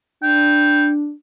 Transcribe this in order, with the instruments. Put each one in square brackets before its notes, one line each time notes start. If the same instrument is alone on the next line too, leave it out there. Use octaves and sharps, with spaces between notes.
[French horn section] D4 [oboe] G5